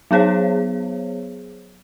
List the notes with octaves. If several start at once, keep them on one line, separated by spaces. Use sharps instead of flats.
F#3 B3 G#4 C5 C#5